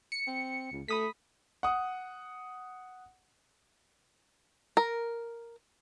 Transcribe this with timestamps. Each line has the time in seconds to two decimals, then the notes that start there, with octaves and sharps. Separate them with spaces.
0.12 C#7
0.27 C4
0.72 C#2
0.88 A3 B5 D#6 B6
1.63 F#5 D#6
4.77 A#4